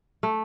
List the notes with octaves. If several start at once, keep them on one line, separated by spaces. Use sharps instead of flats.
A3